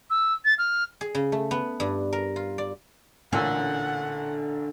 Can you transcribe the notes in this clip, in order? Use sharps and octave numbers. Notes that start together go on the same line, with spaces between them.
E6
A6
F6
G#4
C#3
A3
B3
G2
A#4
F4
D5
A1 A#2 D3 C#4 F#5 E6